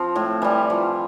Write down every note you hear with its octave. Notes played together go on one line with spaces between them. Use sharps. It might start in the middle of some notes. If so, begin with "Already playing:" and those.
Already playing: F3 C4
A2
E3 G3
F3